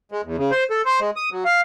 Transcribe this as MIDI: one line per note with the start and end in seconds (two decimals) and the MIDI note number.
0.12 0.21 56
0.24 0.36 40
0.37 0.51 49
0.51 0.64 72
0.70 0.82 69
0.85 1.00 72
1.00 1.11 56
1.16 1.30 87
1.32 1.44 54
1.45 1.61 77